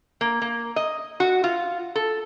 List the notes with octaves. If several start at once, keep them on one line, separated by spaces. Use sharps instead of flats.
A#3
A#3
D#5
F#4
F4
A4